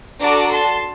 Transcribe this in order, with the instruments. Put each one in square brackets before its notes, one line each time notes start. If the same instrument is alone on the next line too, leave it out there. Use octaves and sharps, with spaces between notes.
[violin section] D4 F#4 A4 A#5 D6
A5 C6